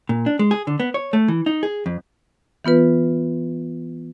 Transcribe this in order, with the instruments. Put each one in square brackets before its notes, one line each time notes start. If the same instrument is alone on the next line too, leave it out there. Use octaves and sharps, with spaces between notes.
[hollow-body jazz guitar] A#2
D4
G#3
G#4
D3
B3
C#5
A3
E3
D#4
G#4
F2
[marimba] E3 B3 F4 B4